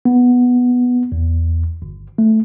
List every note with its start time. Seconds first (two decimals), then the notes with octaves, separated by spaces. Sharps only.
0.05 B3
1.12 E2
1.82 G1
2.18 A3